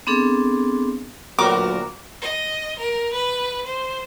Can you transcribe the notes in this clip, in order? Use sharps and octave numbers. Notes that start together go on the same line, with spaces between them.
B3 C4 D4 G#4 A4
D2 A#2 F#3 B3 F#4 A#4 D6
D#5
A#4
B4
C5